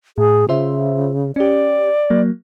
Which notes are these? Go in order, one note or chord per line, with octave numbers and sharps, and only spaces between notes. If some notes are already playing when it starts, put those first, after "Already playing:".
A2 G#4
C#3 F4 C5 E5
C#4 G4 D5
F#3 A#3